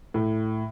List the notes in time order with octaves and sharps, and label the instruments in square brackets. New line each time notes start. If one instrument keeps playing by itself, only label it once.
[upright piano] A2